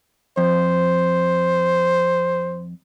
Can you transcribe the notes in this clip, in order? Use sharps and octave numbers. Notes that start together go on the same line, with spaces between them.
F2 C5